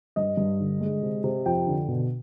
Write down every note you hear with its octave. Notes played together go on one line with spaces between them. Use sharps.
G2 D#5
G2
D3
G#3
C3
C3
F2 G5
D3
B2